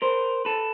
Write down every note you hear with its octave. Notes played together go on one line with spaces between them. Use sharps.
A#4 C5
A4 B4